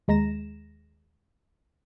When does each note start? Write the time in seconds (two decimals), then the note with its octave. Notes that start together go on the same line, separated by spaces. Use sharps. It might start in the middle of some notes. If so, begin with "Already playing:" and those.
0.08 D#2 G#3 A#5 A#6 E7